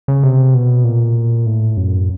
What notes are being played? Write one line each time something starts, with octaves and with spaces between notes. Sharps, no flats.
C#3
C3
B2
A#2
A2
F#2